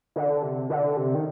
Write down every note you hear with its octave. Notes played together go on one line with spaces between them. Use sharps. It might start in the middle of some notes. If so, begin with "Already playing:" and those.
D3
C3
D3
C3
D#3